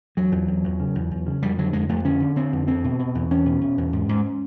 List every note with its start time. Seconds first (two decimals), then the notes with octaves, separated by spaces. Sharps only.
0.17 E2 F#3
0.32 E2
0.48 E2
0.64 E2
0.80 C#3
0.95 E2
1.11 E2
1.26 C#3
1.42 F2 G3
1.58 D3 F#3
1.73 F2 G#3
1.89 F2 A3
2.04 D3 C#4
2.20 D3
2.36 D3 C4
2.53 F2
2.68 E2 C4
2.84 B2
2.99 B2
3.15 E2
3.31 E2 C#4
3.45 B2
3.61 B2
3.78 E2
3.93 G#2
4.09 G#2